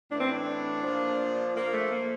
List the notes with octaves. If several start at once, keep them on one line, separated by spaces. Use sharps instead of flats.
A2 E3 D4
C4
D4
A#2 F3
A#2 F3 A#3
A3
A#3